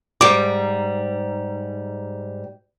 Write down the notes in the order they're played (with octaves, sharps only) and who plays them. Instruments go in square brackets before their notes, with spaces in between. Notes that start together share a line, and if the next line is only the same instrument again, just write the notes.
[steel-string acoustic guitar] G#2 G3 [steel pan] D6